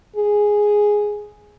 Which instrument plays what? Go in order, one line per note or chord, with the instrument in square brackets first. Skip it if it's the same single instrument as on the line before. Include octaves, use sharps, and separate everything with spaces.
[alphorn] G#4